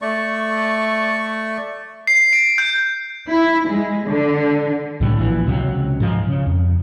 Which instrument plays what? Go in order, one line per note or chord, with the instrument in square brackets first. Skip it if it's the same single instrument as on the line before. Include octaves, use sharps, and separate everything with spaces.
[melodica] A3 D5 C#6
[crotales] C7
D7
G6
[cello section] E4
G#3
D3
[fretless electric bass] C2 A2 D3 G3
A#1 E3
C#2 C3 D#3 F#3
G#2 F3 G#3
C#3
F2